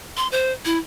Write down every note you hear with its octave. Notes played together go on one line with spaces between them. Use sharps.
C6
C5
E4